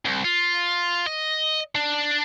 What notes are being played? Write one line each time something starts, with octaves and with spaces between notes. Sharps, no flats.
C2
F4
D#5
D4